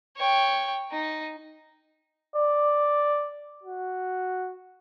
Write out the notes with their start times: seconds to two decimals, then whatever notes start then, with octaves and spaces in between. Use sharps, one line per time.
0.17 C#5 G5
0.92 D#4
2.36 D5
3.63 F#4